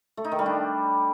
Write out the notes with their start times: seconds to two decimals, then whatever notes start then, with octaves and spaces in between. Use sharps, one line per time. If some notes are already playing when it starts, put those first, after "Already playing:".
0.17 A3
0.25 D#4
0.32 D#3
0.39 G3
0.46 D4